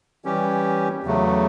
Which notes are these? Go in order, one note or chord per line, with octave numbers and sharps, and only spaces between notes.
E3 G3 C#4 G4
E2 C#3 F#3 A3